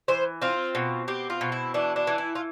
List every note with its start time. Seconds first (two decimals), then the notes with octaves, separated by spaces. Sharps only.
0.08 E3 C5
0.42 C4 F4
0.75 B2
1.08 C4 G4
1.30 F4
1.41 B2
1.52 E4
1.74 E3 D4
1.96 D4
2.07 E3
2.18 E4
2.35 F4